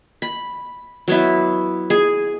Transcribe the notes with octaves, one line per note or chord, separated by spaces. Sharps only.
B5
F#3 B3 E4
G#4